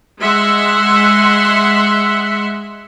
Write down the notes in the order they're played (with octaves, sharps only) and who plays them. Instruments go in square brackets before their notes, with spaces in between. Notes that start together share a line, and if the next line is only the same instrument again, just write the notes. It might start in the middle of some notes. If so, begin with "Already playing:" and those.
[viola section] G#3 E5 F#5 C6